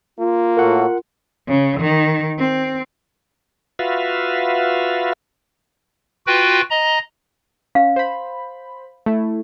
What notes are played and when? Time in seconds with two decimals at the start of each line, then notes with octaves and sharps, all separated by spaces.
0.19 A#3 F4
0.57 A2 F#4 A4 A#4 F#5
1.48 C#3
1.80 D#3
2.39 C4
3.79 F4 F#4 B4 E5 F5
6.27 F4 F#4 B4 G5
6.70 D#5 A#5
7.75 C#4 F5
7.96 C5 B5
9.06 A3 E4